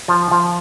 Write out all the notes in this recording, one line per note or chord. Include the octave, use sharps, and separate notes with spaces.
F3
F3